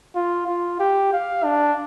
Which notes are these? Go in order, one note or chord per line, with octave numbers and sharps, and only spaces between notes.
F4
F4
G4
F5
D4